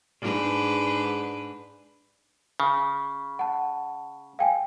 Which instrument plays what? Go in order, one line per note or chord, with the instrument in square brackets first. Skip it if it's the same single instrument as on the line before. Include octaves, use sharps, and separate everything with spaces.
[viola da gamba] G#2 D4 B4
[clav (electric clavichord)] C#3
[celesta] F#5 A5
F5 G5 G#5